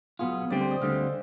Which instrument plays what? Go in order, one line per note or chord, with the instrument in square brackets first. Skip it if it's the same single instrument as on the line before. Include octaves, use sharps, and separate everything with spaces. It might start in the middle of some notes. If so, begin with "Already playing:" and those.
[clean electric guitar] B1 B2 B3 F4 [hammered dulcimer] G#4
[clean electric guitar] D2 D3 G3 C4 [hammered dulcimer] D5
[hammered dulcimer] C5
D#5
[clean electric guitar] D2 D3 G3 C4 [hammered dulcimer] F5